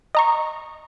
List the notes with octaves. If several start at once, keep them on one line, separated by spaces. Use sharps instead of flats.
D#5 A#5 C#6